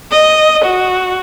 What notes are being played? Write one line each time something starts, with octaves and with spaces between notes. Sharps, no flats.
D#5
F#4